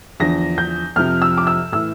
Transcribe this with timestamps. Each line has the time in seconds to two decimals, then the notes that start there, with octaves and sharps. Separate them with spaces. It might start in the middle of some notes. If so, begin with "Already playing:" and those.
0.20 E2 D3 F3 A#6
0.58 G6
0.96 F2 C3 F3 F6
1.22 E6
1.38 D6
1.47 E6
1.72 A2 E3 E6